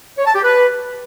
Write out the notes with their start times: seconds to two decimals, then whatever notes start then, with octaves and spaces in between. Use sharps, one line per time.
0.18 C#5
0.26 A5
0.35 G4
0.43 B4